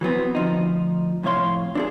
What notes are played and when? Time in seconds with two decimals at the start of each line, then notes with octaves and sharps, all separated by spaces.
0.01 E3 F#3 B3 C4
0.35 D2 F3 D#4
1.23 F2 A2 C3 C#5 F5 C6
1.75 D4 E4 G#4